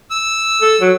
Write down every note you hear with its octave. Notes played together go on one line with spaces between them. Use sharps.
E6
A4
F#3